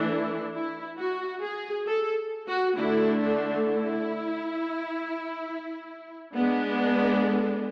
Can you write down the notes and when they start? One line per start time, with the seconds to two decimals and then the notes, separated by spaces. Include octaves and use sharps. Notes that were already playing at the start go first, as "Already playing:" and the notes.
Already playing: E3 A3 D4
0.08 E4
0.53 E4
0.98 F#4
1.41 G#4
1.87 A4
2.46 F#4
2.76 D3 A3 D4 E4
3.21 D4
3.66 E4
6.34 G#3 B3 D4
7.24 A4